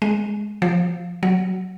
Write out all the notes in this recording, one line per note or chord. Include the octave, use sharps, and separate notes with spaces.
G#3
F3
F#3